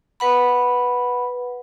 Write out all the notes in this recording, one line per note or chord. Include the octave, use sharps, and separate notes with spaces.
B4 F#5 B5